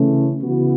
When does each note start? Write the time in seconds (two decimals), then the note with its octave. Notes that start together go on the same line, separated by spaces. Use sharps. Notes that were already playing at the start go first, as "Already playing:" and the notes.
Already playing: C#3 E3 A3 C#4
0.42 C#3 E3 B3 F#4